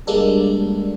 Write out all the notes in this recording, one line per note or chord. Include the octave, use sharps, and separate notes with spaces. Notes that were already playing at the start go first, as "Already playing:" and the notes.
G3 G#3 A#3 D4 A4